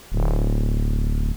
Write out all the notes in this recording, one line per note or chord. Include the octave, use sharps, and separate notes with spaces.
D1